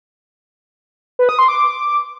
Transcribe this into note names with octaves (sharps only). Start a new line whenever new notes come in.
B4
D#6
C6
D6